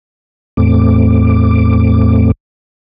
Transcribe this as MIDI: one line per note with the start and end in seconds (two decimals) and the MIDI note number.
0.57 2.32 40
0.57 2.32 45
0.57 2.32 57
0.57 2.32 60
0.57 2.32 86